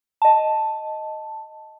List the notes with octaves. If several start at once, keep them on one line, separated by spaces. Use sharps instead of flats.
D#5 A5